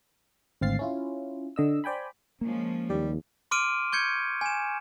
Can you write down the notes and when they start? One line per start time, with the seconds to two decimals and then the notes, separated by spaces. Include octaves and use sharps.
0.61 G#1 D2 C4 F5 A6 C7
0.79 C#4 E4 F4
1.56 D3 D#5 E6
1.84 C5 D5 G5 G#5 B5
2.41 F3 G#3 A#3 C#4
2.89 D#2 G3
3.51 C6 D6 F6 D7 D#7
3.92 C#6 G6 G#6 C#7
4.41 G#5 E7